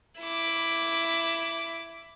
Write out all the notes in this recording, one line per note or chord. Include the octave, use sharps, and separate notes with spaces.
E4 D6